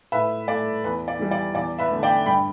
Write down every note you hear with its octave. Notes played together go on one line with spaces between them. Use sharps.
A2 B4 E5
A3 D5
E2 B4
D5
E3 G3
D5
E2 D5
B4 E5
D3 A3
D5 G5
G2 G5 B5